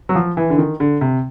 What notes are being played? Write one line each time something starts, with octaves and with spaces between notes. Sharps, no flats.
F#3
F3
E3
D3
D#3
D3
C3